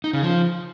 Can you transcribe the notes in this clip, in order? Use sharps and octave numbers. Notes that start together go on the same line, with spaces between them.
D#4
C#3
F3